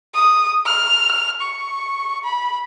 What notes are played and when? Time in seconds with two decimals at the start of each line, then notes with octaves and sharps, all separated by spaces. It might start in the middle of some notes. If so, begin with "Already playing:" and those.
0.14 D#6
0.66 F6
1.41 C#6
2.24 B5